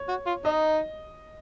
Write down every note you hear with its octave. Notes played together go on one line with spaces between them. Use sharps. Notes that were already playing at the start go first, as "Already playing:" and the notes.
Already playing: C#5
F#4
F4
D#4 D#5